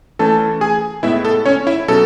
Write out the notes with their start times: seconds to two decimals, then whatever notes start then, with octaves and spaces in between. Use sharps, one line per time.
0.19 E3 A3 C#4 A4 A5
0.61 G#4 G#5
1.03 A2 G#3 B3 E4 E5
1.25 A4
1.45 C#4 C#5
1.67 E4 E5
1.88 B2 F#3 C#4 A4